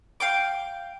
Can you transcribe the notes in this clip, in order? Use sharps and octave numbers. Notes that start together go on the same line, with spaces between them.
F5 G5 D6